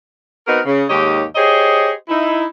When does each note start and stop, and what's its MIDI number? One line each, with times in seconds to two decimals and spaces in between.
0.47 0.60 59
0.47 0.60 60
0.47 0.60 63
0.47 0.60 66
0.47 0.60 70
0.65 0.83 49
0.89 1.24 39
0.89 1.24 44
0.89 1.24 51
0.89 1.24 67
0.89 1.24 73
0.89 1.24 75
1.35 1.92 67
1.35 1.92 68
1.35 1.92 72
1.35 1.92 73
1.35 1.92 75
2.09 2.45 63
2.09 2.45 64